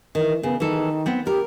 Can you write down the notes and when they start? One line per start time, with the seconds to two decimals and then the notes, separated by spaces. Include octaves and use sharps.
0.15 D#3 E3
0.43 C#3 B3
0.60 D#3 E3 A4
1.06 B3 C4
1.27 G4 A#4